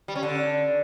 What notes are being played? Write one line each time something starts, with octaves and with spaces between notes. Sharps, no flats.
G3
C#4
D3